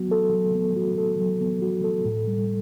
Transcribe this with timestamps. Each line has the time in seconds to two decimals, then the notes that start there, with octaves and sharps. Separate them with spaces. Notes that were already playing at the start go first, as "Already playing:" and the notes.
Already playing: F#3 B3 F#4
0.11 A4
0.33 F#3
0.55 B3
0.76 F#4
0.98 A4
1.19 F#3
1.41 B3
1.62 F#4
1.84 A4
2.05 A2
2.27 G3